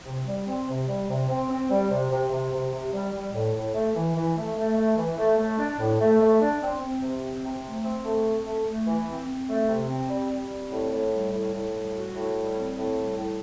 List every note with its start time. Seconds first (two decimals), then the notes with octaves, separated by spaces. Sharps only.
0.06 C3
0.26 G3
0.47 C4
0.68 C3
0.88 G3
1.09 C3
1.29 C4
1.49 C4
1.70 G3
1.90 C3
2.10 C3
2.31 C3
2.52 C3
2.72 C3
2.93 G3
3.14 G3
3.34 A2
3.54 A2
3.75 A3
3.96 E3
4.15 E3
4.36 A3
4.56 A3
4.77 A3
4.97 E3
5.18 A3
5.38 A3
5.59 D4
5.79 A2
6.00 A3
6.20 A3
6.41 D4
6.61 C4
6.81 C4
7.02 C3
7.22 C4
7.43 C3
7.64 A3
7.84 C4
8.04 A3
8.25 C4
8.46 A3
8.66 A3
8.86 E3
9.07 C4
9.28 C4
9.48 A3
9.68 C3
9.89 C4
10.09 G3
10.30 G3
10.50 C4
10.71 A2
10.91 A2
11.12 G3
11.32 A2
11.53 A2
11.73 G3
11.93 F#4
12.14 A2
12.34 G3
12.55 C4
12.76 A2
12.96 G3
13.17 A2